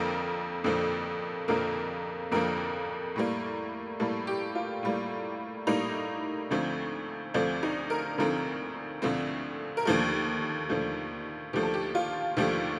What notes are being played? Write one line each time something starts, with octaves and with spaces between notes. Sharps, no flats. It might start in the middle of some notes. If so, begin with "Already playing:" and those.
Already playing: F2 D3 F3 A#3 A#4
F2 D3 F3 A#3
F2 D3 F3 A#3 A#4
F2 D3 F3 A#3 A#4
A2 G3 A#3
A2 G3 A#3 A4
G4
F4
A2 G3 A#3
A2 G3 A#3 D#4
D2 D3 F3 A3 C4
D2 D3 F3 A3 C4 D4
D#4
A#4
D2 D3 F3 A3 C4 A#4
D2 D3 F3 A3 C4
A#4
D#2 D3 F3 A3 A4
D#2 D3 F3 A3
D#2 D3 F3 A3 G4
A4
G4
F4
D#2 D3 F3 A3 G4